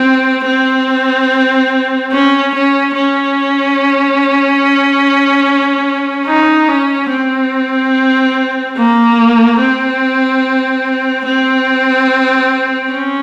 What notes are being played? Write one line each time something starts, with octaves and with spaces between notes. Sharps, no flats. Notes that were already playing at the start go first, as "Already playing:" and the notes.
Already playing: C4
C4
C#4
C#4
C#4
D#4
C#4
C4
A#3
C4
C4
C#4